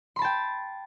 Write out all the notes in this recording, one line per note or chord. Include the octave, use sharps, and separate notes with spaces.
G5 A5 B5 C6